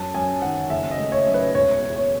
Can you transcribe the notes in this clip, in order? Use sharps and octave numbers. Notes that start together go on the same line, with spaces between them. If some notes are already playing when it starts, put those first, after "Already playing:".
Already playing: F#2 A5
F#2 G#5
D#3 F#5
F#1 E5
D#5
A3
C#5
F#2
B4
E1 C#5
E2
C#5